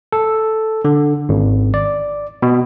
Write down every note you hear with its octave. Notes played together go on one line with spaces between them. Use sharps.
A4
D3
G#1
D5
B2